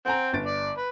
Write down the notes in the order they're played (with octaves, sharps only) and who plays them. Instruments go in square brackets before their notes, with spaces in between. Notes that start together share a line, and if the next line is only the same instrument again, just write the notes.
[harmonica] C4 [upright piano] F#5 G#5 A#5
[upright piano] G1 A6 D7
[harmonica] D5
B4